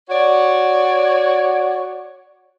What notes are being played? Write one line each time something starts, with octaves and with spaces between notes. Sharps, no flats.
F#4 C#5 D5